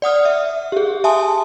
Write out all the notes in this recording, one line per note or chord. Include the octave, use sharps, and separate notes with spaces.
D5 F#5 D#6 F6
E5
G4 G#4
E5 G#5 A5 C6 D#6